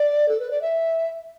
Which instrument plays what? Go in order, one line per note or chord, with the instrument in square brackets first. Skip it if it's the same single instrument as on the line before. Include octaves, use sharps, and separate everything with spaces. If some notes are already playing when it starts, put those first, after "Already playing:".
Already playing: [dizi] D5
A4
B4
D5
E5